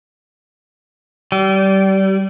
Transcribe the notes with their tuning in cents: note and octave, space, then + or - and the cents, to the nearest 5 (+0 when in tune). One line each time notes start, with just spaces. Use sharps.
G3 -25